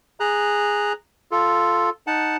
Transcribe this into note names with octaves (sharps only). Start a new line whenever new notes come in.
G#4 A#5 F#6
F4 A4
D#4 F#5 A5